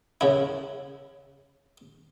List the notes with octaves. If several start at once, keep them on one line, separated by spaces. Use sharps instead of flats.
C#3 E4